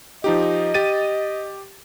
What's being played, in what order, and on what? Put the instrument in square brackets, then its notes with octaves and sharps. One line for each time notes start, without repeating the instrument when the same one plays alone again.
[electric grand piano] F3 D#4 G4 [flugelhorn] D#5
[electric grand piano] G4 A6 D#7